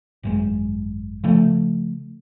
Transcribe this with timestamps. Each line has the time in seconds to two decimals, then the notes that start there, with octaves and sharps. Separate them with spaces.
0.23 G#1 F#2 G#3
1.24 C#3 F3 A3